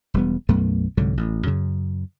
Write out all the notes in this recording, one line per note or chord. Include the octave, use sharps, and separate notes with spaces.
E1 G3 B3
B1 F#2 A3 B3
C2 G#2 D3 F#3
A1
F#2 C#3